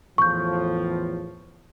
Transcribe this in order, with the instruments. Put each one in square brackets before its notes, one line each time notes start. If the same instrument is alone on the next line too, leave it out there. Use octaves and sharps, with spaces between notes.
[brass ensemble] E2 A2 F3 [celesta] C#6 G6